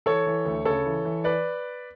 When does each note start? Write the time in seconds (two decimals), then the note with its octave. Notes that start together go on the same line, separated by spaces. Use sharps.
0.06 E3 A4 C#5
0.26 E3
0.45 D2
0.65 C#3 A4 C#5
0.86 E3
1.05 E3
1.24 B4 D5